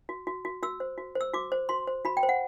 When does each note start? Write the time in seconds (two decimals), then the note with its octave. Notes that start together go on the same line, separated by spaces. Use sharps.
0.09 F#4
0.27 F#4
0.45 F#4
0.63 F#4 E6
0.80 C5
0.98 F#4
1.15 C5
1.21 E6
1.33 F#4 D6
1.52 C5
1.69 F#4 C6
1.87 C5
2.05 F#4 B5
2.17 G5
2.23 C5
2.29 F#5